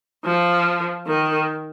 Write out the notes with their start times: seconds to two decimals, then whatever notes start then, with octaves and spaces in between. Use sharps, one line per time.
0.25 F3
1.07 D#3